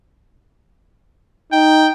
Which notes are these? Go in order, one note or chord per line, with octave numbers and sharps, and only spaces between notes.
D#4 G5